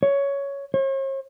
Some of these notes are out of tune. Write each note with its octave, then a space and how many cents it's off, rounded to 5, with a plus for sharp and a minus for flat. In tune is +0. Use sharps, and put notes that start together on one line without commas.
C#5 +10
C#5 -45